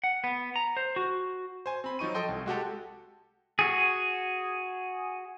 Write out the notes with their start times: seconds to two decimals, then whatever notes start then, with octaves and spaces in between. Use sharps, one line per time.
0.04 F#5
0.24 B3
0.56 A#5
0.77 C5
0.96 F#4
1.66 C5 G#5
1.84 C4 B5
1.99 F3 F#3 D#4 C#6 D#7
2.15 A4 D#5 G5 C6
2.29 C2
2.46 G#3 F#4 G4 A4
3.59 F#4 G#4